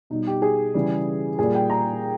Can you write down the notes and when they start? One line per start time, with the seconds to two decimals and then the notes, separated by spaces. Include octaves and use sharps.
0.10 B2 G3 D#4
0.27 G4
0.42 G#4
0.74 C#3 E3 G3
1.39 A#2 G3 G#4
1.55 G5
1.70 A#5